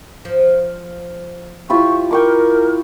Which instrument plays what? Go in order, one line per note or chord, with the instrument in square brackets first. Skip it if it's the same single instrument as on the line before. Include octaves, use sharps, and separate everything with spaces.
[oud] F3
[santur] E4 F4 G4 [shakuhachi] C#6
[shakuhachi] A#4 [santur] G5 C#6 D6